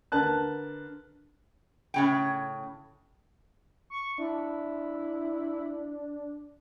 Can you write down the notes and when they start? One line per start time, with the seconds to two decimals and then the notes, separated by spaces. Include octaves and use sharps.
0.12 D3 A#4 B4 A5 F#6
1.94 A2 C#3 G5
3.90 C#6
4.18 D4 E4